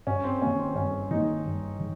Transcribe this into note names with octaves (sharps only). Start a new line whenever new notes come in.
G2 C#4
C4
D#3 A#3 C#4
C4
G2 C#4
D#3 A#3 D#4
G2
D#3